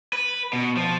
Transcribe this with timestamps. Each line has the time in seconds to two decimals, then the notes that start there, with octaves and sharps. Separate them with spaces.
0.13 B4
0.53 B2
0.77 F3